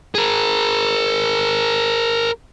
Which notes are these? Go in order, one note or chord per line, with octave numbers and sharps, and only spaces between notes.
G#4 A#4